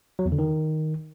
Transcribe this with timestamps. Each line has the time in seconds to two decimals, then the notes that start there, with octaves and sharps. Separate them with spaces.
0.19 F#3
0.26 E2
0.32 D3
0.39 D#3